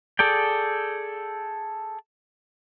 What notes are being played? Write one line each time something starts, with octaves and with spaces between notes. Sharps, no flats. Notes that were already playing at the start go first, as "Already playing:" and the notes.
G#4 A4 D5 G5